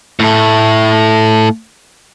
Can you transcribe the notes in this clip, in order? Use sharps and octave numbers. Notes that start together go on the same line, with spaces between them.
A2 A3